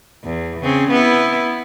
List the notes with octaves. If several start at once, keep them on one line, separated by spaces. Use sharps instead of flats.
E2
C#3 C4
B3 E4